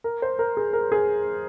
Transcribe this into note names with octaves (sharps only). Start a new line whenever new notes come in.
A#4
C5
A#4
G#4
A#4
G#4